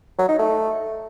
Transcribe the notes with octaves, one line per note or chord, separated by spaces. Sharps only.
F#3
D#4
A3